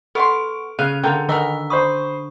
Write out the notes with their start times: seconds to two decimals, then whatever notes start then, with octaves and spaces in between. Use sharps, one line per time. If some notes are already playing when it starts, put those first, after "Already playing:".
0.15 B3 A4 F5 C6 C#6 D7
0.79 C#3 F5 F#6 D#7 F7
1.04 D3 F4 A#4 G5
1.29 D#3 D#4 F#4 A#4 D#5 E6
1.70 C5 B5 C#6 D#6